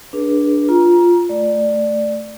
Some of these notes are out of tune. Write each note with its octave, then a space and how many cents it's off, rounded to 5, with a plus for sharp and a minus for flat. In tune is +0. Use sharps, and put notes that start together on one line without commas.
D4 +0 G#4 +0 B4 -30
F4 +0 A#5 +20
A3 +0 D5 +5